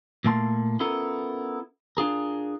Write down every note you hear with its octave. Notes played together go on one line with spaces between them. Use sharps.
A#2 A3 A#3 E4 A5 C6
B3 C#4 E4 F4 A4 A#4
D4 F4 G#4 A#4